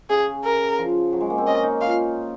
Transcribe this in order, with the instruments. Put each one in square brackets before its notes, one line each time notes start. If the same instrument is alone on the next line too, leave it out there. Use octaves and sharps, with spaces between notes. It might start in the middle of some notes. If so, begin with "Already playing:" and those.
[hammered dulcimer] C#3 [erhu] G#4
[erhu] A#4
[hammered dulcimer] F3
F#3
G#3
A#3
C4
[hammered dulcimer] C#4 [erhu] D#5
[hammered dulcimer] D#4
[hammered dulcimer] F4 [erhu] F5